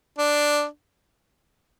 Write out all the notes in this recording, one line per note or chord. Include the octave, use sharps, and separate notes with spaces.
D4